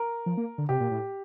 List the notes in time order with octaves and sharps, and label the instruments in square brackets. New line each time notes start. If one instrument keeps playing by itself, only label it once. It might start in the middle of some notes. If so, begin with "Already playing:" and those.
Already playing: [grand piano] A#4
[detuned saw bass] F3
A#3
D3
[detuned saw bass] C3 [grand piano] G4
[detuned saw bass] A#2
A2